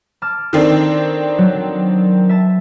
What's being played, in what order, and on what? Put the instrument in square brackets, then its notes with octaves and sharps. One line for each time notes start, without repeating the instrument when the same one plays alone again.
[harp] A5 D6 F6
[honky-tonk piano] D#3 C4 D4 [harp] A4
[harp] F#3
E5 A5